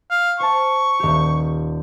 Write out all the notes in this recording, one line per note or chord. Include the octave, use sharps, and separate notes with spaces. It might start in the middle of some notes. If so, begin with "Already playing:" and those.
F5
C5 A5 C#6
D#1 G4